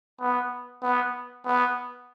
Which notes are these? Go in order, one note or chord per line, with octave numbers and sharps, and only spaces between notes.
B3
B3
B3